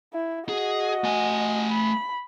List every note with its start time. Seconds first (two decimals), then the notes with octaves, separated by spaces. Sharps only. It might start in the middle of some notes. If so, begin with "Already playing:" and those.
0.14 E4
0.49 F#4 G#4 D#5
1.04 A3 G#5
1.71 B5